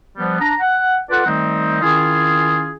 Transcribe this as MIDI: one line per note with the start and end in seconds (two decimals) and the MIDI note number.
0.17 0.38 53
0.17 0.38 55
0.17 0.38 59
0.40 0.53 62
0.40 0.53 82
0.60 0.97 78
1.10 1.23 65
1.10 1.23 69
1.10 1.23 71
1.10 1.23 74
1.10 1.23 78
1.26 1.78 51
1.26 1.78 55
1.26 1.78 57
1.26 1.78 60
1.26 1.78 63
1.81 2.75 51
1.81 2.75 61
1.81 2.75 64
1.81 2.75 65
1.81 2.75 68